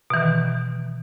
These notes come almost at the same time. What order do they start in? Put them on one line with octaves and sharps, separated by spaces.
B2 E3 D#3